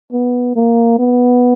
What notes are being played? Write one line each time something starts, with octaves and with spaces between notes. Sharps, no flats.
B3
A#3
B3